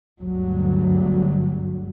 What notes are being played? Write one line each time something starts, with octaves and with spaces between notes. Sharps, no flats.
G1 D2 F#3 G3